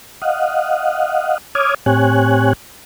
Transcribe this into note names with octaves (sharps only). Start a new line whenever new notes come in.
D#5 F5 F#5
C#5 D6 D#6 F6 G#6
A2 C4 G4 C#5 G#5 F#6